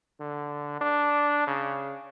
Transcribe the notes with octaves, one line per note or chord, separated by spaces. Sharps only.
D3
D4
C#3